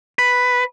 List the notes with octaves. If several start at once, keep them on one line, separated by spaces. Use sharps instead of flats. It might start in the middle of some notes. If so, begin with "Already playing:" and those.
B4